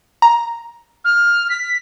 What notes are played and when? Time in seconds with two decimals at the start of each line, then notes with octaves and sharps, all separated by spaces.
0.22 A#5
1.05 F6
1.50 B6